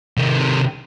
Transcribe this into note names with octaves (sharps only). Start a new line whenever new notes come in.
C3 D#3